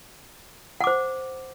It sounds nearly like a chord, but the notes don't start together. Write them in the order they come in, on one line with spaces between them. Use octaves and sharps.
F#5 D6 C5